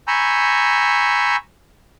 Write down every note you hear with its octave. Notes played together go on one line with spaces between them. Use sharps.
G#5 A#5 B5 C#6 E6 G6